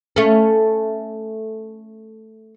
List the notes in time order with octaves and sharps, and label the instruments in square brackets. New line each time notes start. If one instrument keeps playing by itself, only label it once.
[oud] A3 C#4